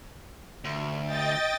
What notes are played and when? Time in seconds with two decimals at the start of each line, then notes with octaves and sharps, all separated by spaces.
0.65 D2
1.05 D#5 G5 A6